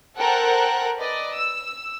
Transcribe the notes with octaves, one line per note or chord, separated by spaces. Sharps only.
A4 A#4 C5 F#5 G5 F#6
B4 D5 D#5
E6